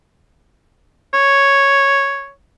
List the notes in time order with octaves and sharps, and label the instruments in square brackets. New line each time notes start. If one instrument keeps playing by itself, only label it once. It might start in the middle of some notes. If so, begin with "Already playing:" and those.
[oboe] C#5